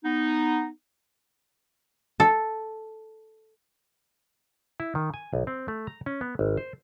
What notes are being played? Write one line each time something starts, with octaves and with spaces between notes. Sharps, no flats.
B3 D#4
A4
E4
D#3
G#5
B1
C4
A3
A#5
C#4
B3
G#1
C5